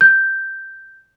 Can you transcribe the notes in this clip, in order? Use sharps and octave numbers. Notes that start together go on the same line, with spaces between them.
G6